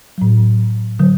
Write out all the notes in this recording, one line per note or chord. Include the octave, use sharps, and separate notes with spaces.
A2 F#3
D3 F#3